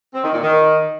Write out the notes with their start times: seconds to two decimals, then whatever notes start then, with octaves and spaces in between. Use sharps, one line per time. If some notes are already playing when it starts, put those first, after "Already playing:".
0.14 C4
0.23 D#3
0.32 A#2
0.41 D#3